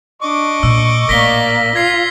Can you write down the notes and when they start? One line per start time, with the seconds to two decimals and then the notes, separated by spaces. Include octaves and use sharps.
0.22 D4 D#5 C#6 D6
0.63 A#2 E6
1.09 A#1 A2 A#3 D5 A#6 B6 G7
1.75 F4 G#6 B6 C7